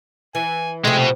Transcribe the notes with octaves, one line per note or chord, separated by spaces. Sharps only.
E3 G#5
C3 F3 G#3 A3
B2